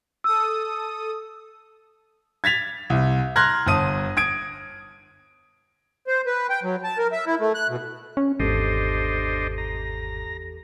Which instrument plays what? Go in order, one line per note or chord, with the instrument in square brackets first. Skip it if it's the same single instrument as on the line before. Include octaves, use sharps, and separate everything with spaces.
[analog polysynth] A4 D#6 [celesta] E6
[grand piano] G#6 A6 B6 F7
C2
A#5 C6 F6 F#6 G#6 A#6
G1 A5 D#6 D#7
D#6 G#6 D7
[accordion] C5
B4
G5
F#3
A5
A#4
E5
E4
A3
F#6
B2
[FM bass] C#4
[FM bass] G#1 [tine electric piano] E2 G4 A4 [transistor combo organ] D4 C5 D#5
[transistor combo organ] A#5